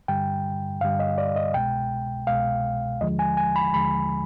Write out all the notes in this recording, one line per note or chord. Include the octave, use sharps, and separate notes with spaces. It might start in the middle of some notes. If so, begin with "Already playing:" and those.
G2 D3 G3 G5
G2 D3 G3 F5
D#5
D5
D#5
C2 B2 G#3 G5
C2 B2 G#3 F5
D#2 D3 F3 G#3 D#5
G#5
G#5
B5
D#2 D3 F3 G#3 B5